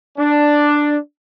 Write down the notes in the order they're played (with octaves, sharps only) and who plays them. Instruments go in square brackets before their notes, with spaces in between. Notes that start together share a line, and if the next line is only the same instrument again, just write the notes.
[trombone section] D4